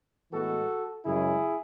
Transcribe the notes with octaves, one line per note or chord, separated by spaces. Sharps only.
A2 E3 G#3 B3 F#4 A4
F#2 C#3 G#3 E4 G#4